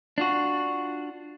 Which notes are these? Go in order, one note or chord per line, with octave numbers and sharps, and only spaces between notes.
D4 F4 F#4